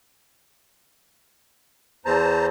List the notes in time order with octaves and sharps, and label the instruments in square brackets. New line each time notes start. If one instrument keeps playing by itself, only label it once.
[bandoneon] E2 [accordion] C5 A5 A#5